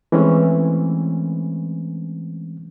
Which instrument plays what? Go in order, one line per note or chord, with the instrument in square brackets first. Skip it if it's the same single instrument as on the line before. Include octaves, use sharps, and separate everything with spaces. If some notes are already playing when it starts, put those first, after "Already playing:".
[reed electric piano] E3 G#3 A3 C4 C#4